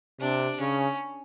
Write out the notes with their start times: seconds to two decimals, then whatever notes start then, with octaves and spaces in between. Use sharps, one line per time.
0.21 C3 D4
0.60 C#3 C#4